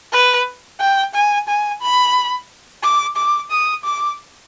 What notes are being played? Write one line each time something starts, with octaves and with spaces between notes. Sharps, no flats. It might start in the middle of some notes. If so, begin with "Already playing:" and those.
B4
G5
G#5
G#5
B5
D6
D6
D#6
D6